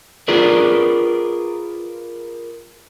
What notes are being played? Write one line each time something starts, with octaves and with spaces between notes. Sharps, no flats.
F4 G#4 A#4 B4 D5